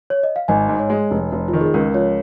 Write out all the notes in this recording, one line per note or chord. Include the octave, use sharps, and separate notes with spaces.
C#5
D#5
F5
G#1 D#5 G#5
G#2
C#5
G#3
F1
F1
F4
D#3
G#4
C#2 A#4
F3 C#5